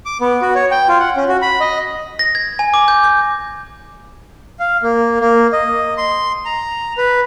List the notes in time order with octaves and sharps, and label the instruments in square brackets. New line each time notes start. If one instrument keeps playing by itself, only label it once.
[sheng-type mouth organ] D6
B3
F#4
C#5
G5
F4
F#5
C#4
F#4
B5
D#5
[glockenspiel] A#6
G#6
G#5
D6
G6
G6
[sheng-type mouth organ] F5
A#3
A#3
D#5
C6
A#5
B4